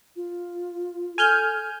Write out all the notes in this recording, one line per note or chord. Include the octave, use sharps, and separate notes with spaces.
F4
A4 G#5 F6 G6